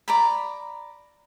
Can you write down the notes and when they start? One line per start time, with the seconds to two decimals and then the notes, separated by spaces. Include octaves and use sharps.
0.08 D5 A#5 B5